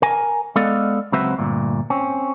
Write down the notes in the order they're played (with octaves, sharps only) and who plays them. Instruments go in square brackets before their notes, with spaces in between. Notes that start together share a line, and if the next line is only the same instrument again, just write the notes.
[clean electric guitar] A#4 G#5
G#3 B3 A4 D5 D#5 F5
C#2 F#3 C4 F#4 B4 E5
D2 G2 A#2
C4 C#4